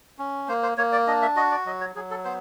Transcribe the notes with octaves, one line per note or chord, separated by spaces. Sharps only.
C#4
A#3 C5
C5
A#3 C#5
D5
D4 D#5
E5
F#4 D#5
D5
F#3 D#5
C#5
F#3 G#4
A4
B3 C5